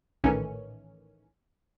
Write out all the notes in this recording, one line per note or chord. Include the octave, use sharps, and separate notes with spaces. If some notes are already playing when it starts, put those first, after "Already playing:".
A#1 A2 D#3 E3 C#4